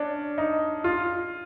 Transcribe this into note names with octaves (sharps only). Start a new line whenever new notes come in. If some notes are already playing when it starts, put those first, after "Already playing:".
Already playing: C#4 D4
D#4
F4